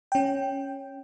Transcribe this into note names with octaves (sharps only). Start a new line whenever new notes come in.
C#4 G5